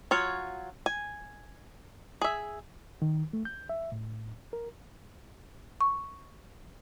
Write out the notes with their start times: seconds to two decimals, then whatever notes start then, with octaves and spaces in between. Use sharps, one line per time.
0.11 F#3 F4 C#5
0.86 G#5
2.21 G#4 E5
3.02 D#3
3.33 A3
3.45 G6
3.69 E5
3.92 A2
4.53 A#4
5.81 C#6